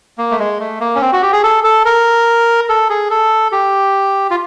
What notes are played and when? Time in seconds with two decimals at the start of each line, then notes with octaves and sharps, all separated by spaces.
0.18 A#3
0.31 A3
0.39 G#3
0.60 A3
0.80 A#3
0.95 C#4
1.01 C4
1.12 F#4
1.22 G4
1.33 G#4
1.43 A4
1.64 A4
1.85 A#4
2.69 A4
2.90 G#4
3.10 A4
3.52 G4
4.31 F4